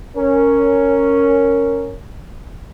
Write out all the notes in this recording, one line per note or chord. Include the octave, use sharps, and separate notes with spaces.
C#4 A#4